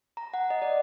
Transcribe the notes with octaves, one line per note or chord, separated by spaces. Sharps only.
A#5
F#5
D#5
D5